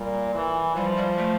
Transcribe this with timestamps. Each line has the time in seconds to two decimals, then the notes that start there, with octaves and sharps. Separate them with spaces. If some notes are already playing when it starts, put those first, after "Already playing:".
Already playing: A#2 G3
0.35 E3
0.75 F3 G3
0.96 G3
1.17 A3